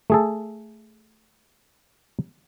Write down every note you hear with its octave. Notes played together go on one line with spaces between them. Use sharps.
A3 G#4 A4